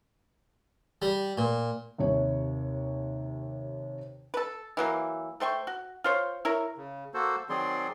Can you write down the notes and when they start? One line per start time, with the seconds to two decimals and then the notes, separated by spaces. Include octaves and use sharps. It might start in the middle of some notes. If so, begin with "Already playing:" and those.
1.02 G3
1.38 A#2
1.98 D#2 C3 C#5
4.34 A4 B4
4.77 E3 F#3 A#3
5.40 A3 C5 G5 C#6
5.67 F#4
6.04 F4 C5 C#5
6.45 E4 A#4 C#5
6.77 C#3
7.14 A#3 F#4 A4 C5
7.49 D#3 F#3 C4 G#4 D5 C6